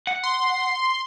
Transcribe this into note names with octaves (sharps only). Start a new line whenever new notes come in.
F#5
C6